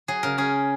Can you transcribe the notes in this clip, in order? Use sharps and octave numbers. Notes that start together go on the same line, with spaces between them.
F#3 G#4
C#3 A#4
C#4 G#4